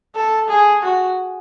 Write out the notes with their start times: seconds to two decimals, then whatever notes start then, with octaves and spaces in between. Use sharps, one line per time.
0.15 A4
0.49 G#4
0.83 F#4